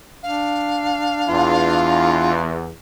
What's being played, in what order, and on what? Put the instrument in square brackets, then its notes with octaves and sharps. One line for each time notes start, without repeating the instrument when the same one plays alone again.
[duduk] D4 [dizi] F5
[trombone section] E2 [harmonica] F4